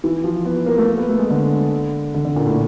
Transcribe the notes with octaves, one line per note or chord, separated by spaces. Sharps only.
E3
F3
B3
A#3
A3
A#3
B3
A3
G#3
D3
D3
D3
A#2
A2